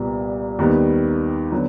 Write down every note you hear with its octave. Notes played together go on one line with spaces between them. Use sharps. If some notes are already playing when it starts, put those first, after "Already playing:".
Already playing: C2 A#2 G3 B3
D#2 D#3 G3 B3
D3 F#3 B3